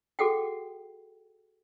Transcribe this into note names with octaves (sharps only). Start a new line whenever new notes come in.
F#4 G#4 A4 F#5 G5